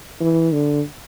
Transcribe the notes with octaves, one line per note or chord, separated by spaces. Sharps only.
E3
D3